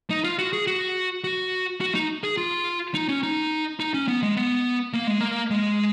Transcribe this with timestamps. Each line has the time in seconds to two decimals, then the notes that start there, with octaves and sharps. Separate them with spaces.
0.10 D#4
0.24 F4
0.39 F#4
0.53 G#4
0.67 F#4
1.24 F#4
1.81 F#4
1.95 D#4
2.24 G#4
2.37 F4
2.94 D#4
3.09 C#4
3.23 D#4
3.80 D#4
3.94 C#4
4.08 B3
4.23 G#3
4.37 B3
4.93 A#3
5.07 G#3
5.21 A#3
5.50 G#3